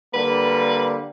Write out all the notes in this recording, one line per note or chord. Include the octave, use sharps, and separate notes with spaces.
D3 G3 A#3 B4